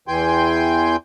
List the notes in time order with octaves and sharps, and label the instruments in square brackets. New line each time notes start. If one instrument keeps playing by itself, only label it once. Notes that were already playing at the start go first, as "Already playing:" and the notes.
[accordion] E2 E3 G5 G#5 C6 G6